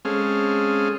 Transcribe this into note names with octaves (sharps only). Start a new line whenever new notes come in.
G#3 C4 C#4 G#4 A4 F5